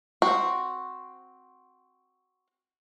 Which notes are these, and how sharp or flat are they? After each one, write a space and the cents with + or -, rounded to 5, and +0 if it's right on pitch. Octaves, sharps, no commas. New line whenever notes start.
C4 +0 F#4 +0